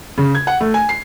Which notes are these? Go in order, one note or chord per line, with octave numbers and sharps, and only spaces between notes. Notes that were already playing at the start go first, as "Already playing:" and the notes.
C#3
G#6
F#5
A3
G#5
C7